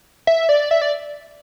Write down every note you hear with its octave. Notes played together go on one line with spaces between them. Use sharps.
E5
D5
E5
D5